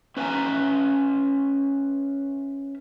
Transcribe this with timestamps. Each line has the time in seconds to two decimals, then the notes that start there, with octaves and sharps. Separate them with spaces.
0.17 C#4 B4 E5 F#5 G#5 A#5